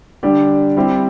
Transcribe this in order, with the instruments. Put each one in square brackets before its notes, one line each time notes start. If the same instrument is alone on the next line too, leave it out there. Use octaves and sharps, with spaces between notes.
[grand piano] D3 G3 D4 G4 D5
G3 C4 E4 G4